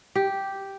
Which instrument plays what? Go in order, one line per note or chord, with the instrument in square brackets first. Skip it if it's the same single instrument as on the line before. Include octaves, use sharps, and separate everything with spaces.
[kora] G4